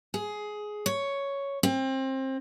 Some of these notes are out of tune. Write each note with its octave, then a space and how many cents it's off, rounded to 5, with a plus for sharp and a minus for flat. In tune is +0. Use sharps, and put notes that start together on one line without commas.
G#4 +15
C#5 +5
C4 +25